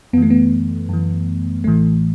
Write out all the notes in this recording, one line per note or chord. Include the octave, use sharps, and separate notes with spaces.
F#2 E3 A3 B3
B3
F#2 E3
A1 A2 E3 A3